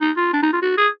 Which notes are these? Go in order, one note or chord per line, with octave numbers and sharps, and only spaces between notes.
D#4
F4
D4
D#4
F4
F#4
G#4